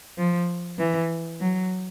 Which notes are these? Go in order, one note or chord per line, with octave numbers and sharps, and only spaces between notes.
F3
E3
F#3